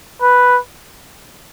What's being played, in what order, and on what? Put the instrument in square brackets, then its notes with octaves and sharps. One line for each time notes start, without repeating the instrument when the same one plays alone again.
[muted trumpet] B4